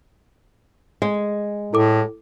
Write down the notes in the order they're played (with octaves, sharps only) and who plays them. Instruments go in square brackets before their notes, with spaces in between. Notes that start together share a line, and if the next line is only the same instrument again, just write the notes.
[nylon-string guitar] G#3
[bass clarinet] A2 [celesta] E4 A4 D6